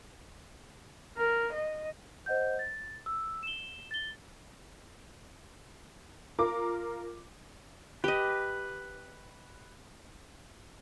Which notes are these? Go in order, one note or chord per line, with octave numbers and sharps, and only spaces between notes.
A#4
D#5
C5 D#5 F#5 G6
A6
E6
E7 G7
A6 G7
F4 A#4 D6
G4 B4 D#5